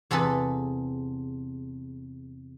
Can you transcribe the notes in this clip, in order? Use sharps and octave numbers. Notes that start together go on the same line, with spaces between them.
E2 C3 G#4 A4 B4